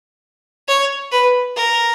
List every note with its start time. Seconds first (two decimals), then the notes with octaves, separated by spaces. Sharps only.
0.68 C#5
1.11 B4
1.56 A#4